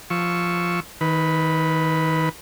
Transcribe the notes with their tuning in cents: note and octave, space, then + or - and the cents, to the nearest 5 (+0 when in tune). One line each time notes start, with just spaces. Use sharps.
F3 +0 C#6 +0 E6 +0
D#3 +30 B4 +0